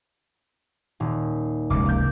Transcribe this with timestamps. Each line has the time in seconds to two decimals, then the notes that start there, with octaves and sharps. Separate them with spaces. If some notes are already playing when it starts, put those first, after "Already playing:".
1.00 D#1
1.70 F1 C#2 D6
1.86 A#3 G6